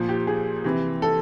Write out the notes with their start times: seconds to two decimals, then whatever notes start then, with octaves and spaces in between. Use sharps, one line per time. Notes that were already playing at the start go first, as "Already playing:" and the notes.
Already playing: A#2 F3
0.09 G4
0.27 G#4
0.64 C3 E3
1.02 A4